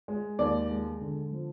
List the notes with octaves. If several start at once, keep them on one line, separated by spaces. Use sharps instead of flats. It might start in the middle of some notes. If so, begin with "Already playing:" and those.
G#3
D#2 D5
G#3
D3
F3